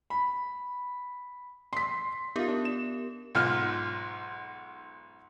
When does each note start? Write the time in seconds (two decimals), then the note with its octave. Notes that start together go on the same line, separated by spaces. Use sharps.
0.10 B5
1.73 C6 B6
2.36 B3 D#4 F4 G4 A#4
2.48 D4
2.65 E7
3.35 B1 G#2 F4 F6